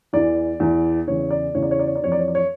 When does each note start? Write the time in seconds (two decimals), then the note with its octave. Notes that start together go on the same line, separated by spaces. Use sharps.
0.13 E2 E3 D5
0.60 E2 E3
1.07 E2 C#3 E3 C#5
1.31 D5
1.55 E2 C#3 E3 C#5
1.63 D5
1.71 C#5
1.80 D5
1.87 C#5
1.96 D5
2.02 F2 E3 C#5
2.12 D5
2.19 C#5
2.28 D5
2.35 C#5